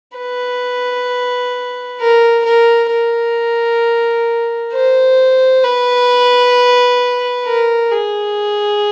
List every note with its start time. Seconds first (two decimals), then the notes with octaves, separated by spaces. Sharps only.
0.18 B4
2.00 A#4
2.45 A#4
2.91 A#4
4.73 C5
5.64 B4
7.45 A#4
7.91 G#4